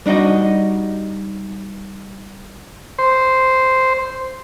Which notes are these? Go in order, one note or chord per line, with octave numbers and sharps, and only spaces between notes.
G3 D4 D#4 F#4 D#5
C5